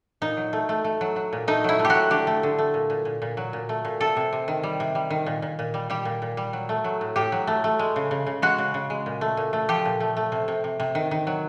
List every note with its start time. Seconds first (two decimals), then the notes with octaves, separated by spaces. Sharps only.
0.22 A#2 D#4
0.37 F#3
0.53 A3
0.69 A3
0.84 A3
1.01 F#3
1.16 F#3
1.33 A#2
1.48 A3 D#4
1.64 F#3 E4
1.79 A3
1.85 G4
1.90 F#4
1.95 F#3
2.11 D3 G4
2.27 A3
2.43 D3
2.58 A3
2.74 A#2
2.90 A#2
3.05 A#2
3.22 A#2
3.37 F#3
3.53 A#2
3.69 A3
3.85 A#2
4.00 C3 A4
4.17 C3
4.33 C3
4.48 D#3
4.63 G3
4.80 C3
4.95 G3
5.10 D#3
5.26 A#2
5.42 A#2
5.59 A#2
5.74 G3
5.90 G3 G4
6.05 A#2
6.22 A#2
6.37 G3
6.53 F#3
6.69 A3
6.84 F#3
7.01 A2
7.16 A2 G4
7.32 F#3
7.47 A3
7.64 A3
7.79 G#3
7.96 C#3
8.11 C#3
8.26 C#3
8.42 G#3 F#4
8.58 C#3
8.74 C#3
8.90 G#3
9.06 A#2
9.21 A3
9.37 A#2
9.53 A3
9.69 F3 G4
9.85 A#2
10.00 A3
10.17 A3
10.32 C3
10.48 C3
10.64 C3
10.80 C3
10.95 D#3
11.11 D#3
11.27 F#3